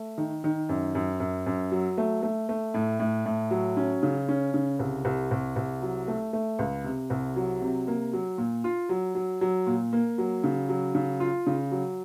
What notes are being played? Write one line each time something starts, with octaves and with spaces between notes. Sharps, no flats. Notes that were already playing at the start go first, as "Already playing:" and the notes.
Already playing: A3
D#3
D#3
F#2
F#2
F#2
F#2
F#3
A3
A3
A3
A2
A2
A2
F#3
C#4
C#3
C#4
C#3
C2
C2
C2
C2
F#3
A3
A3
C#2
C3
C2
F#3
C3
A#3
F#3
A#2
F4
F#3
F#3
F#3
A#2
A#3
F#3
C#3
F#3
C#3
F4
C#3
F#3